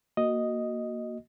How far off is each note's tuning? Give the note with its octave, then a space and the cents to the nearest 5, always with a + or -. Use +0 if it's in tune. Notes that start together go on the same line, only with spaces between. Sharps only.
A#3 +0 F#4 +0 D#5 +0